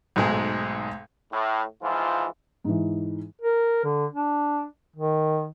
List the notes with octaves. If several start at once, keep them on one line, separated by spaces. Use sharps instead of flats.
B1 G#2 G#3 A3 G#4
A2
G#2 E3 F3 F4
G#2 E3
A#4
D3
D4
D#3